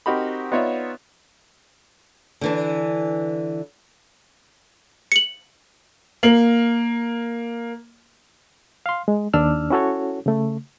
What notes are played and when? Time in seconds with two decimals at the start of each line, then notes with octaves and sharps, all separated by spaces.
0.06 C4 D#4 F#4 G4 A#4 B5
0.52 B3 D#4 F4 C#5 D5 E5
2.41 D3 E3 D4
5.12 C#7 F#7
6.23 A#3 F#7
8.86 F5 C6
9.08 G#3
9.34 D#2 D4 E6 F6
9.70 C#4 E4 F#4 A4 C#5
10.26 C#3 A3